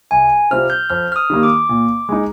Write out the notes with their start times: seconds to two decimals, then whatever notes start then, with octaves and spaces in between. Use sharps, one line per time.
0.11 C2 G#5
0.51 C3 G3 C4 F4 F6
0.70 G6
0.89 F2 F6
1.12 F6
1.16 D#6
1.30 D#3 G3 A#3
1.43 D6
1.69 A#2
2.09 G#3 D#4